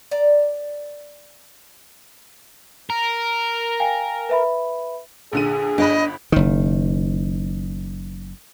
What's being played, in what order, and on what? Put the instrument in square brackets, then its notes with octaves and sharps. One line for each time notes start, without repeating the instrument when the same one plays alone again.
[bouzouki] D5 A#5
[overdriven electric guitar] A#4
[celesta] F5 G5 G#5
B4 E5 B5
[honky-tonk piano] A#1 D3 D#7 [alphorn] G#4
[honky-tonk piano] G1 B5 [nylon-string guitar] D4 [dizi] D#5
[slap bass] F#1 D#3